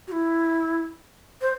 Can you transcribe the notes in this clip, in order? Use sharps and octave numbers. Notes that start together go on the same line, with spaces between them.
F#4
E4
C5